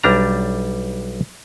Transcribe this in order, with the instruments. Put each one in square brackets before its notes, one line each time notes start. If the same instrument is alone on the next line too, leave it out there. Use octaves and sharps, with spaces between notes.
[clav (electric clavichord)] B1 G3 D4 A#5